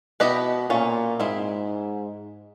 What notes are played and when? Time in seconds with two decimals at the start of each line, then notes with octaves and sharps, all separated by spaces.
0.20 B2 B3 E4 G4 B4 D#5
0.70 A#2 A3 C#4 F4
1.20 G#2 G#3 C4 E4